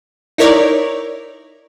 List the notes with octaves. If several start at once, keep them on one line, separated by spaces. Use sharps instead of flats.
D#4 E4 A#4 C#5 D5